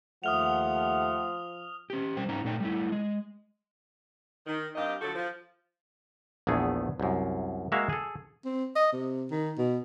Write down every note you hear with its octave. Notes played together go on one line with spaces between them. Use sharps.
D#2 F3 A3 F#5 D#6 F6 F7
C#4 G4
C3 G3 C5 G5
G#2 C#4 D#4 G5 A#5
A#2 A3 D#4 A4 D5 G5
G3 A3 E4
G#3
D#3
G2 C4 G4 A#4 D#5 F5
D3 F3 F#3 F#4 A4
F3
A#1 E2 A3 B3 G#4
C2 F#2
G#3 A#3 F#4 E5 F5
G#4 A4
C4
D#5
C3
D#3
B2